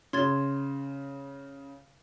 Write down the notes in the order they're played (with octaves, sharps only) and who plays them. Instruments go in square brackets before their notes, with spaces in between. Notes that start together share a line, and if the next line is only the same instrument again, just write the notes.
[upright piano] C#3 [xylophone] C6 G#6 A6